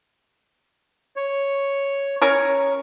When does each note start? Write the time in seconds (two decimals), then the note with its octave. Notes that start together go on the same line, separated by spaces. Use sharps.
1.16 C#5
2.22 C#4 A#4 C#5